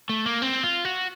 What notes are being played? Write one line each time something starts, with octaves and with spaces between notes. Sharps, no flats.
A3
A#3
C4
F4
F#4